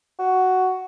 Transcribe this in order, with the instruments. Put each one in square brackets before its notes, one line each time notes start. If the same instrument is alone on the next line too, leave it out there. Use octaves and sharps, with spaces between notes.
[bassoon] F#4